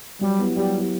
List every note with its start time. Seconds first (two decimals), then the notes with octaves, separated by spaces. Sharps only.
0.21 F#3 G3
0.39 B3 E4 G4
0.56 F#3 G3
0.74 B3 E4 G4